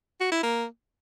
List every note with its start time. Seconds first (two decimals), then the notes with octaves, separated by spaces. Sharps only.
0.20 F#4
0.32 E4
0.43 A#3